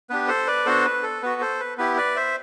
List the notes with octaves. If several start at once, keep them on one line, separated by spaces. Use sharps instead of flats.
B3 D4 G4 B4
A4 C5
B4 D5
B3 D4 F#4 A4 C5
B4
A4
B3 F#4 B4
A4 C5
B4
B3 E4 G4 B4
B4 D5
C5 E5